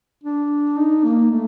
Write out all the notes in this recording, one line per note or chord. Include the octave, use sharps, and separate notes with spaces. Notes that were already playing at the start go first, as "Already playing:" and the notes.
D4
D#4
A#3
A3